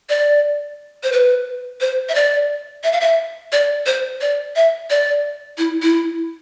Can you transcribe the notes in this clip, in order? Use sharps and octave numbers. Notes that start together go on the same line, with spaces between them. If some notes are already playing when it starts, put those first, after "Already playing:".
D5
C5
B4
C5
E5
D5
E5
F5
E5
D5
C5
D5
E5
D5
E4
E4